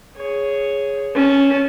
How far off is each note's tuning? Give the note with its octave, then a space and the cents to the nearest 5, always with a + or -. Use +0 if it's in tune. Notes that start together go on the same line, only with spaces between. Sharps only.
G#4 +0 C#5 +0
C#4 +0 A5 -30